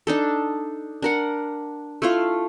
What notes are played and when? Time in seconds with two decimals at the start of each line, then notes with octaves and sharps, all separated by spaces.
0.07 D4 D#4 A4
1.02 D4 A#4 F#5
2.02 A3 E4 F4 F5